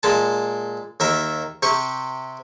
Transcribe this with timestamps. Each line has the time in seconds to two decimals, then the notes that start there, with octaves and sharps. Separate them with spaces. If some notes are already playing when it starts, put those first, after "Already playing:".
0.03 A#2 G#3 A5
1.00 D#2 A#4 E5
1.63 C3 G4 C#6